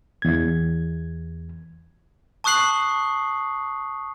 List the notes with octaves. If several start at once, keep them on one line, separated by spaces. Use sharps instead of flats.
E2 G#6
A5 C#6 D#6 F#6 C7 F#7